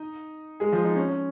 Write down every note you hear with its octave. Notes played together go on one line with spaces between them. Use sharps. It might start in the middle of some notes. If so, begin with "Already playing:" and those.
Already playing: D#4 D#5
G#3 G#4
F3 F4
D#4
C#4
C#4